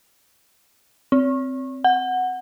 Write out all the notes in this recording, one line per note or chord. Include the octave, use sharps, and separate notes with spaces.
C4
F#5